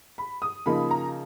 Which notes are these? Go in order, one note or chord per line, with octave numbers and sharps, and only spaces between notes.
B5
D#6
C#3 F3 A#3 D#4 B5
A#5